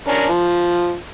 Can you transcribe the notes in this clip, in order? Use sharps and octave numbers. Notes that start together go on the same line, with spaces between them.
C#4 D4 A#4
F3